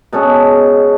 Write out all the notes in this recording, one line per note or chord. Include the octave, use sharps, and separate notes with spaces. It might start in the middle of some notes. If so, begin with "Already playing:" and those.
B2 G#3 C#4 A4